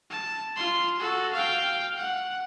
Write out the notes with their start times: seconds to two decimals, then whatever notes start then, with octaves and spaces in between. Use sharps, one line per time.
0.11 A5
0.56 F4 C6
0.99 F#4 A4
1.33 F5 G5
1.97 F#5